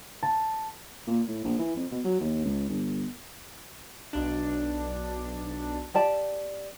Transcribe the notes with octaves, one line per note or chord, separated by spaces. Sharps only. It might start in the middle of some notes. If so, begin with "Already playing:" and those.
A5
A#2
A2
A#1
E3
F2
B2
F#3
D#2
C#2
G1
B1 D4
G4 D5 A5